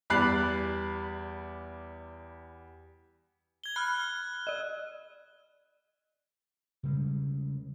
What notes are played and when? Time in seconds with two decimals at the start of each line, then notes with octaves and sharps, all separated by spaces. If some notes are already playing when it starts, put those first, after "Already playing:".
0.10 E2 G3 D5 B5 F#6 C7
3.64 G#6 G7
3.76 B5 F6 F#6 G#6
4.47 D5 D#5
6.83 C#3 G3 G#3